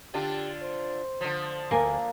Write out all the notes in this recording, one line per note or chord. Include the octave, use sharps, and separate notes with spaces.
D3 D4 F4 G4
C5
D3 F3
D2 A#3 G#5